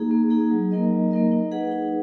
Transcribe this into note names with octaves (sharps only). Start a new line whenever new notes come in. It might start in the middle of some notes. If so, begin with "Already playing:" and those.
Already playing: A#3 D#4 G#4
A#3
D#4 G#4
F#3
A#3 D#4 A#4 D#5
F#3
A#3 D#4 A#4 D#5
D#4
G#4 B4 F#5
D#4